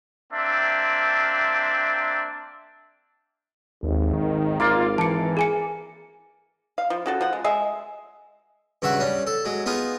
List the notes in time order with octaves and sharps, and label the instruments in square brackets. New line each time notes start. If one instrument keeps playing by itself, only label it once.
[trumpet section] A#3 C4 D4 E5
[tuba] G#1 [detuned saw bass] D#2
[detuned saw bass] D#3
[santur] A#3 D5 F5 [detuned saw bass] F4
[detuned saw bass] E3 [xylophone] A5 C#7
[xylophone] G#4 G#5 C#7
[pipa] F5
F3
C#3 F#4 A4
F3 F#5
G#3
G#3 G#4 E5
[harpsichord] G2 C#3 F#4 E5 F#5
G3 C#4
A4
F#3 G#3
B3 D#4 F4 G#4